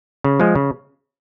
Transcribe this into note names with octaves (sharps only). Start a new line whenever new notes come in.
C#3
F3 G#3
C#3